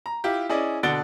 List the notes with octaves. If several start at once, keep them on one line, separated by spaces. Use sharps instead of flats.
A#5
E4 F4 G4
C#4 E4 G#4 D5 D#5
B2 D3 F#5 A6 D7 G7